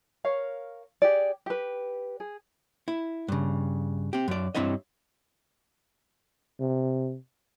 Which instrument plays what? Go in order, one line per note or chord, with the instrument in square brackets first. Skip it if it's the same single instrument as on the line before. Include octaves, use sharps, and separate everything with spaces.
[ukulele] A#4 C#5 F5
G4 G#4 D5
G4 B4
G#4
[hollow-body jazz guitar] E4
G2 C#3
C4 G4
F#2 D5
G2 C4 E4 C#5 D#5
[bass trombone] C3